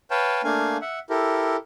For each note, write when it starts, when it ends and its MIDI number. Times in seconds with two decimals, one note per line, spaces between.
0.11 0.42 71
0.11 0.42 73
0.11 0.42 77
0.11 0.42 79
0.11 0.42 81
0.44 0.77 57
0.44 0.77 58
0.44 0.77 62
0.44 0.77 77
0.44 0.77 80
0.82 0.99 76
0.82 0.99 78
1.10 1.56 64
1.10 1.56 67
1.10 1.56 69
1.10 1.56 70